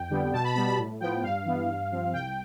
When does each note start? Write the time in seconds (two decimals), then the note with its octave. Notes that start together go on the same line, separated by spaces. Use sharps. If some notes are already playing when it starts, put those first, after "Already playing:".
Already playing: F2 G5
0.10 D3 G3 B3
0.32 B2 A5
0.44 B5
0.55 G3 B3 B5
0.66 B5
0.77 A2
1.00 F3 B3 G5
1.23 G2 F5
1.45 E3 B3
1.68 G2
1.91 F3 C4
2.13 C2 G5